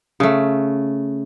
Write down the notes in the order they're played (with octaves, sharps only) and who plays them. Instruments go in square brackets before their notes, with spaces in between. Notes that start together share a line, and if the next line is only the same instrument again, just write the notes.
[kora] C#3 A3